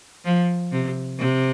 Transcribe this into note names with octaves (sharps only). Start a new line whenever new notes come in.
F3
C3
C3